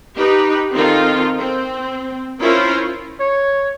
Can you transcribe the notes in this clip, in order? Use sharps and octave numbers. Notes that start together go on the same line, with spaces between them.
D#4 G4 B4
D#3 C4 D#4 F4 A4
C4
C#4 E4 F4 A#4 C5 C#5
C#5